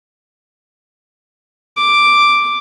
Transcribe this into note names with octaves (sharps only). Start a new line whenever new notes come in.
D6